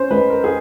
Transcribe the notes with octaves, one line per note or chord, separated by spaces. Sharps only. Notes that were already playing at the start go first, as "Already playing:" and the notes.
Already playing: C#4 C5
G#3 B4
A#4
G#4